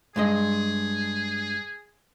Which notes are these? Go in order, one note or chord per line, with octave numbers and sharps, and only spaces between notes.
G2 G#3 G#4 D#5